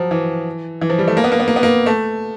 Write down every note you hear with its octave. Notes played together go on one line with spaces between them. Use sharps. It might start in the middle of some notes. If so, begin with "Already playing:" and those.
Already playing: F3 F#3
E3
E3
F3
G3
A3
A#3
B3
A#3
B3
A#3
B3
A#3
A3